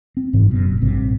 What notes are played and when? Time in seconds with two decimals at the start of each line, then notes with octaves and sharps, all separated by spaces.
0.17 C4
0.33 F#1 G#2 B2 E3
0.48 F#2 B2
0.68 F1 A#2
0.81 A1 G2 C3